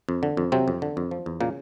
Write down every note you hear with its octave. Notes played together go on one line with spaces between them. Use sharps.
F2
D3
F2
C3 F#3 C4
F2
D3
F2
F3
E2
A#2 C#3 A#3